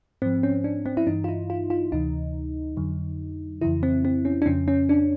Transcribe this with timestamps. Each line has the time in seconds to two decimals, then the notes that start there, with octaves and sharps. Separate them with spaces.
0.22 G#2 F3 C4
0.43 C#4
0.64 D4
0.86 C4
0.97 E4
1.07 G2 E3 D#4
1.24 F4
1.28 E4
1.50 F4
1.70 F4
1.92 D2 C3 E3 D#4
2.77 F2 D3 F#3
3.61 F2 C#3 E3 E4
3.83 C4
4.05 C4
4.25 C#4
4.42 D4
4.46 F2 C#3 F3 C#4
4.68 C#4
4.89 D4